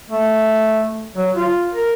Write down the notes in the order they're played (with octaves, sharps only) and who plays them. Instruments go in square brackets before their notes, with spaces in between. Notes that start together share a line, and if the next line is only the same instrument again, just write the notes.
[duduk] A3
F#3
F4
A#4